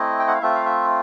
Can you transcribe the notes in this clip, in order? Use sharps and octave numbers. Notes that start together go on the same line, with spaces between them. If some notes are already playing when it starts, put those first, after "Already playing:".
Already playing: A3 C4 E4 D#5
G5
F#5
F5
A3 C4 F4 E5
F5
E5